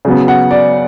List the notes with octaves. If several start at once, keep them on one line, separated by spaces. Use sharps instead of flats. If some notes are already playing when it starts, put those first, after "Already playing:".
C#3 F#3 B3
F#5
D5